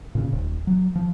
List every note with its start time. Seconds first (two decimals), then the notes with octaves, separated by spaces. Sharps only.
0.15 A#2 C#3
0.32 D#1
0.67 F#3
0.95 F3